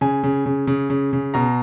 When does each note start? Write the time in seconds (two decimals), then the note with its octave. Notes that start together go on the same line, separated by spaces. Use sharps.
0.01 C#3 G#5
0.24 C#3
0.46 C#3
0.67 C#3
0.90 C#3
1.13 C#3
1.34 B2 A#5